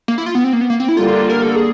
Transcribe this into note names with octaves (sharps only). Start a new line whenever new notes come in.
A#3
E4
F4
B3
C4
A#3
B3
A#3
C4
E4
D3 G3 A#3 F4
A#4
A4
G#4